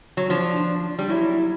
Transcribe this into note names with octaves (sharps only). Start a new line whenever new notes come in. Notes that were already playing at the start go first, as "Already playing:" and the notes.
F#3
F3 D4
G3
F#3 E4